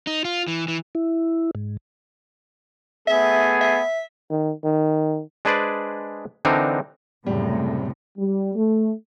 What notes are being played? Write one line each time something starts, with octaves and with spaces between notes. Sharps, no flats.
D#4
F4
E3
E3
E4
G#2
A3 B3 G#4 E5
E5
D#3
D#3
G#3 D4 G#4 B4 C5 D5
D3 E3 C4 D4 D#4 A#4
F#1 A2 C3 G3
G3
A3